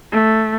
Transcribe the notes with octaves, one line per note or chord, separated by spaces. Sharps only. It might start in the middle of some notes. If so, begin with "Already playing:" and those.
A3